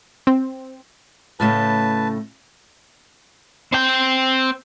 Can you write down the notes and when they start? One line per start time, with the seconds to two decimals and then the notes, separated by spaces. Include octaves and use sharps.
0.27 C4
1.40 A2 C#3 A3 B4 A5
3.72 C4 G5